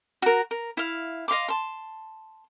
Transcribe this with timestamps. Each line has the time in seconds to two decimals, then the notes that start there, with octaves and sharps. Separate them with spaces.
0.22 F#4 A#4
0.51 A#4
0.77 E4 F5
1.28 D#5 F5 C6 D6
1.48 A5 C6